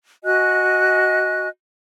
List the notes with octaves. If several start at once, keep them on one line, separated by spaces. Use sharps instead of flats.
F#4 D#5 G#5 F#6